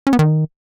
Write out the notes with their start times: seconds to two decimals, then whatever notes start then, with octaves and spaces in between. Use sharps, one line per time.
0.07 C#4
0.13 B3
0.19 D#3